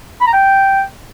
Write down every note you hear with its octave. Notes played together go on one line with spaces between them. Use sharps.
B5
A#5
G5